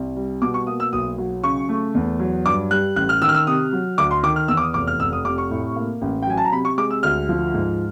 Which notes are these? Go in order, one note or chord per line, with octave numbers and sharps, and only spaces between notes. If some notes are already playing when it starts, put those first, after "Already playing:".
Already playing: C2
G3
B2 D6
C#6
A#3 D#6
E6
B1 D#6
F#3
C#3 C#6
A3
E2
F#3
G2 D6
G3 F#6
A1 F#6
F6
D#3 E6
F6
E6
C3 D#6
F#3
D2 D6
C6
D#3 D6
F6
E2 E6
D6
D#6
F1 D6
F6
F1 E6
D#6
C3 D6
C#6
A2
A#3
A1
G5
F#3 G#5
A5
A#5
C3 B5
C#6
G#3 D6
E6
D2 F6
F3
G#2